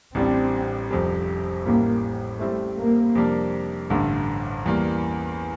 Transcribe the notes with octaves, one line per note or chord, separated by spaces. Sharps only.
A1 A2 G3 C4 D4
F1 F2 C3 G3
A1 A2 G3 A#3
A2 G3 A3 C4
A#3
F2 C3 G3 A#3 D4
A1 G2 D3 A3
E2 E3 G3 A#3